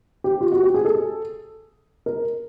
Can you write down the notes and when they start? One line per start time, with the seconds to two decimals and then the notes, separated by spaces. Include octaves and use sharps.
0.24 G4
0.41 F4
0.52 F#4
0.63 G4
0.74 G#4
0.85 A4
2.06 A#4